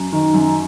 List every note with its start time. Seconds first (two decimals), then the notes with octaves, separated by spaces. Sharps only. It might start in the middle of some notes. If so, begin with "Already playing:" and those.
Already playing: F#2
0.12 D#3
0.34 F#2